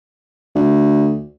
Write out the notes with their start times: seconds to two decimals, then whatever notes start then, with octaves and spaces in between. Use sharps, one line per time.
0.55 D2